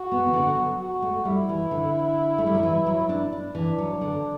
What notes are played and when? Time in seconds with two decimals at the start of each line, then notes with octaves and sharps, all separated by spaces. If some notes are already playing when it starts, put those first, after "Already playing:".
Already playing: F#4
0.12 B3
0.27 E3
0.33 D3
0.57 F#3
0.80 F#4
1.02 A3
1.25 G3 E4
1.49 E3
1.71 D3
2.38 A3
2.47 G3
2.54 F#3
2.63 E3
2.87 F#3
3.09 D4
3.32 D4
3.55 E3 D4
3.78 F#3
4.01 D3